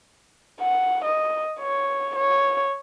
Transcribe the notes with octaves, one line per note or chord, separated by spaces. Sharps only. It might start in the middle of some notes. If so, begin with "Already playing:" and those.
F#5
D#5
C#5
C#5